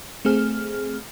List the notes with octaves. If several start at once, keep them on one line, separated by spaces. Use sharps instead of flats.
A3 C4 G#4 F6